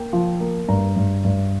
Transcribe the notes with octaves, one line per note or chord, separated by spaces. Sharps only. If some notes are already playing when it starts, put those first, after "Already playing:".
Already playing: A#3 G5
F3
A#3
G2 A#5
G2
G2